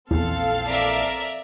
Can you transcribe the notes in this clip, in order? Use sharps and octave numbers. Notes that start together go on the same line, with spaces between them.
A#1 E2 A#2 E3 C4 A4 F5
A#4 D5 E5